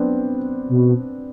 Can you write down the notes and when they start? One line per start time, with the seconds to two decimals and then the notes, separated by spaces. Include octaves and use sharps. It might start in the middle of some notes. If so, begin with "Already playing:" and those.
Already playing: B3 C4 D4
0.69 B2